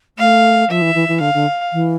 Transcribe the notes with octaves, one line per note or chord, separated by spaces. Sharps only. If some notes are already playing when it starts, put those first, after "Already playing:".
A3 F5
F3 E5
E3
E3
E3
D3 F5
D3
E3